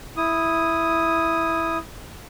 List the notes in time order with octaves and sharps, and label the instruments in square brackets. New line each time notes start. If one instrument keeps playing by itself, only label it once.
[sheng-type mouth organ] E4 D#6